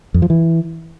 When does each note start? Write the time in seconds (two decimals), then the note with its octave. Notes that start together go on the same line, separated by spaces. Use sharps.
0.14 F2
0.22 F3
0.30 E3